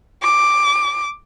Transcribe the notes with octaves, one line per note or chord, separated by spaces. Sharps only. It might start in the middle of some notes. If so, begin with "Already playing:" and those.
D6